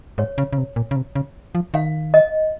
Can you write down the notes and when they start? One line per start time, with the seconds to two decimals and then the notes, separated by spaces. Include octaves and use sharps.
0.18 G#2 C#5
0.38 C#3
0.53 C#3
0.58 C3
0.76 A#2
0.91 C#3
0.96 C3
1.15 C#3
1.55 F3
1.74 D#3 F5
2.14 D#5